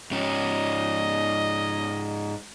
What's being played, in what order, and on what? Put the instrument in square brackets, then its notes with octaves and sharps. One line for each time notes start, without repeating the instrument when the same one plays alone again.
[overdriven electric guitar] G#2 C#4 [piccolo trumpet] D#5